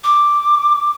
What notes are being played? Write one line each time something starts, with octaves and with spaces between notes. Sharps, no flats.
D6